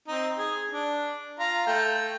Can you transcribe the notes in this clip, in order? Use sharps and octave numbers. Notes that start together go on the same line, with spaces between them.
C4 D#4
G#4
D4
F4 A#5
A3 G5